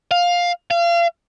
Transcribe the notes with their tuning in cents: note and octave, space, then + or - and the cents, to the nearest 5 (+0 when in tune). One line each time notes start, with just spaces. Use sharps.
F5 +10
F5 -35